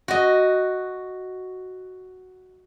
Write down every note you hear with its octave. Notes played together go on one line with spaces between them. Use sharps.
F#4 D#5